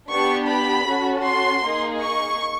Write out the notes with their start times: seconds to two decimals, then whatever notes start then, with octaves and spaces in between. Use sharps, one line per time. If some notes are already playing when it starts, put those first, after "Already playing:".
0.10 B3 D4 G4 C#6
0.49 B5
0.87 C#4 F#4 A4
1.24 C6
1.63 A#3 D#4 G#4
2.01 C#6